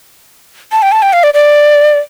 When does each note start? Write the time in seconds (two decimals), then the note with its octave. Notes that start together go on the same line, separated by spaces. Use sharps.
0.72 A5
0.82 G5
0.92 A5
1.02 G5
1.13 F5
1.23 D5
1.34 D5